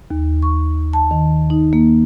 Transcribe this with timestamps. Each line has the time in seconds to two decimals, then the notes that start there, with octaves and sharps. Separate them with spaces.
0.11 D#2
0.42 C#6
0.93 A5
1.11 D#3
1.50 D#4
1.73 A#3